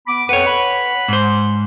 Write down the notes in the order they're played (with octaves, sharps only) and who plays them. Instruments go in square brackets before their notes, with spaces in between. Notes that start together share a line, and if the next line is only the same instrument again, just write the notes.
[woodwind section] B3 B5 D6
[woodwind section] F2 F#5 [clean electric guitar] B4 C#5
[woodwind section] F#5 B5
[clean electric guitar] G#2 C5